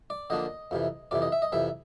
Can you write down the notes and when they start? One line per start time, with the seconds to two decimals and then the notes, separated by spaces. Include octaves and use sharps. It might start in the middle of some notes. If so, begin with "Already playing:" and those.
0.10 D5
0.30 D3 F3 A#3 D4 D#5
0.71 F2 C3 E3
1.11 F2 C3 E3 D5
1.22 D#5
1.32 E5
1.42 D#5
1.52 F2 C3 E3 E5